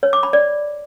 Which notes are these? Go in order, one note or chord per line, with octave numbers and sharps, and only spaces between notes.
C#5
D6
B5
D5